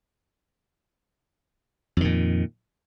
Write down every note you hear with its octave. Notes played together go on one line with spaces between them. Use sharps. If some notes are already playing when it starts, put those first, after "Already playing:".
F2 A#2 D#3